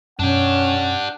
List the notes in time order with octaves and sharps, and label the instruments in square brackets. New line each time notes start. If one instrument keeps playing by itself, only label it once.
[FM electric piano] F#2 B2 [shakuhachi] C#4 [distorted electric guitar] D4 G4 [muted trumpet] F#5